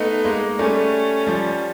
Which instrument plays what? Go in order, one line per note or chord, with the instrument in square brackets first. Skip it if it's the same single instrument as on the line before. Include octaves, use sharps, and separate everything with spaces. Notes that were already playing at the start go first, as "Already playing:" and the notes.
Already playing: [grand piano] A3 B3 [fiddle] D#4
[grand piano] G#3 A#3
[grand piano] G3 A3 [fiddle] C#4
[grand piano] F3 G3